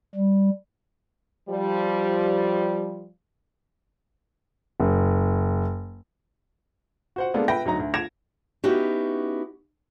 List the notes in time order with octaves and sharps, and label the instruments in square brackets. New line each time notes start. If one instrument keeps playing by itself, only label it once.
[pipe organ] G3
[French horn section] F3 G3
[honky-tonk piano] F#1
[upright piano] F#4 C5 F#5
G#3 A#3 B3 D4 A4
B4 E5 G5 B5 A#6
D2 F#3 D#4 A#5
D2
G#6 A#6 D7 E7 F7
[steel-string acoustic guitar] B3 C#4 D#4 E4 F#4 G4